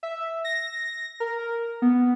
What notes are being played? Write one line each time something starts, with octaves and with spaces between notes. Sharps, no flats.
E5
A#6
A#4
B3